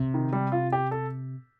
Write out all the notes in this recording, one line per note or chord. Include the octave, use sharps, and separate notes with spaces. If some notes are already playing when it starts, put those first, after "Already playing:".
Already playing: C3
D#3
G3
F4
G4
A4